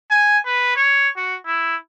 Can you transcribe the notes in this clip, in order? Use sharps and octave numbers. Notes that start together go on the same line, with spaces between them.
G#5
B4
C#5
F#4
E4